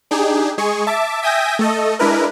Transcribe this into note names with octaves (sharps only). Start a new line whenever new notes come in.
D4 D#4 G4 G#4
G#3 G#4 C#6
E5 A5 D6
E5 G5 G#5 D#6 G6 A#6
A3 A4 D#5
G#3 D4 E4 A#4 B4